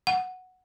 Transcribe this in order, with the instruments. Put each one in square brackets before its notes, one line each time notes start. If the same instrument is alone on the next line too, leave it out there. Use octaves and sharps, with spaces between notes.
[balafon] F#5